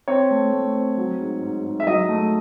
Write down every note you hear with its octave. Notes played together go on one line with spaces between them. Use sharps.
C4 C#5
A3
A3
C4
F#3
G#2
G#2
G#2
E5
F#3 D#5
A3